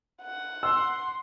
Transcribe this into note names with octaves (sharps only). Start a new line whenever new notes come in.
F#5
C6 E6